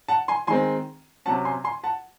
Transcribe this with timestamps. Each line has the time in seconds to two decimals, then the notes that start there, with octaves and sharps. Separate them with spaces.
0.08 F#5 A5
0.28 G#5 C6
0.47 D#3 G#3 C4 G#5 C6
1.25 C3 F#3 C#4 F#5 A5
1.45 G#5 C6
1.64 G#5 C6
1.83 F#5 A5